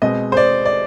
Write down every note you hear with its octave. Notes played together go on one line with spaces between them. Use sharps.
B2 G#3 C4 D#5
C5
D5
D5